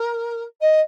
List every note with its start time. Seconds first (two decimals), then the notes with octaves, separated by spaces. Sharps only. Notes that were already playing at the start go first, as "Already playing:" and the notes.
Already playing: A#4
0.61 D#5